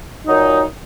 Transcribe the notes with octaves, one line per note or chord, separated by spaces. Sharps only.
A#2 F#3 D#4